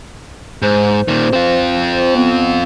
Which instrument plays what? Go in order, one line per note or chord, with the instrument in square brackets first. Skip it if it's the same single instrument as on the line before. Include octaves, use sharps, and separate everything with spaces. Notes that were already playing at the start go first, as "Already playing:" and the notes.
[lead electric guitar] G#2 [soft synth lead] C5
[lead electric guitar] A#2 D#3
C4 F4
[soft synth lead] B3